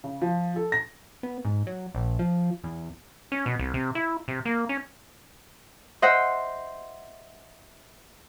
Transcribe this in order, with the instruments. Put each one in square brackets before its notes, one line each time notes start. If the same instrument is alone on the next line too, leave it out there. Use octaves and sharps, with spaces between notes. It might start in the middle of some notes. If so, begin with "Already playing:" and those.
[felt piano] C#3
F3
A4
A#6
[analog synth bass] B3
G#2
F#3
A#1
F3
E2
[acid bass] C#4
B2
C2
C3
E4
C3
A#3
C#4
[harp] C5 D#5 E5 F#5